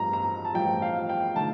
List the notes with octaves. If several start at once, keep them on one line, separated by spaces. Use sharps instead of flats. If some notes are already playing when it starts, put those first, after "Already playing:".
Already playing: A1 G2 F3 A#5
A#5
A5
A1 G2 F3 G5
F5
G5
D3 A3 D#4 A5